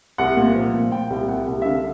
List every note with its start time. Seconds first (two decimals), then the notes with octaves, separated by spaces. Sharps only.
0.18 C2 F#5
0.37 A#2
0.55 F3
0.74 A#2
0.92 A#2 G5
1.10 C2 G5
1.28 C2 F#5
1.47 C2
1.62 E5
1.66 D3 F5